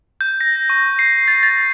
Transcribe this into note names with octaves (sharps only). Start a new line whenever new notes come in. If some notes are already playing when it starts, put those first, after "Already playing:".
G6
A#6
C#6
C7
A6
A6